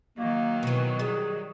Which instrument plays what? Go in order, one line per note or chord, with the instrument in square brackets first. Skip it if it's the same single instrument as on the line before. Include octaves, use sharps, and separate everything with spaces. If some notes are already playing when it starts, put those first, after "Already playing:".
[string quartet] D#3 F#3 [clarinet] A#3
[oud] B2 E3
[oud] G3 [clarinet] G#4